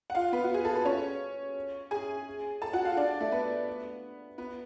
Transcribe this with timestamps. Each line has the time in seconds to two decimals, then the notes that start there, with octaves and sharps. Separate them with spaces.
0.10 F#5
0.15 F4 F5
0.32 B3 B4
0.44 F#4
0.54 G#4
0.65 A4
0.75 B4
0.85 C#4 C#5
1.91 G#4 G#5
2.62 A4 A5
2.73 F#4 F#5
2.85 F4 F5
2.97 D4 D5
3.21 A3 A4
3.32 B3 B4
4.38 B3 B4